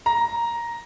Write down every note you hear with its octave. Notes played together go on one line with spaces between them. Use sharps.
A#5